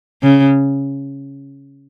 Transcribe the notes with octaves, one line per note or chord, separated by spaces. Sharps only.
C#3